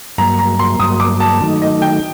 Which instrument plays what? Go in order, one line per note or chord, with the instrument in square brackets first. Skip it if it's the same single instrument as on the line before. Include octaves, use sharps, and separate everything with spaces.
[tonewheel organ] G2 F#3 A#3 [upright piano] A#5
[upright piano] A#5
C6
[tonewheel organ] G2 F#3 A#3 [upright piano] D#6
[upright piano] D6
A5
[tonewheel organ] D#3 F#3 A3 D#4
[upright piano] D#5
G5